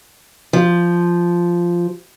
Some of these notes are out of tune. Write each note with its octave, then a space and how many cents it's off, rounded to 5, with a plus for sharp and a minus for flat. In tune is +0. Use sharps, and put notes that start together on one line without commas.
F3 -5